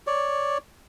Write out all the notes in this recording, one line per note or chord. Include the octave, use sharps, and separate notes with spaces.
C#5 D5